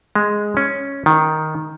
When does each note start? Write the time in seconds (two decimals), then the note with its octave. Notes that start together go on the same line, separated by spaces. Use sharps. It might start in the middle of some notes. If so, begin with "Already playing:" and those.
0.15 G#3
0.57 C#4
1.06 D#3